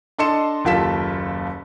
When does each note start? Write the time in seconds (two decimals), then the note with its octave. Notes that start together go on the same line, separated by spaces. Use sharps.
0.18 D4 A4 D#5 C6 C#7 E7
0.65 F#1 D#2 F4 A4 B6 E7